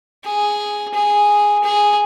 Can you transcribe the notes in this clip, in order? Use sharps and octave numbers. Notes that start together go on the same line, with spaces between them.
G#4
G#4
G#4